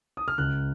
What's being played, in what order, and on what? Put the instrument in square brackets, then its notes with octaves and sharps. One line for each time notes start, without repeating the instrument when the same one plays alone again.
[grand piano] D#6
F6
C#2 F#6